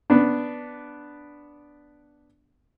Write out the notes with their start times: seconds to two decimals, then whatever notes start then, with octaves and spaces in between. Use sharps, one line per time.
0.10 B3 D4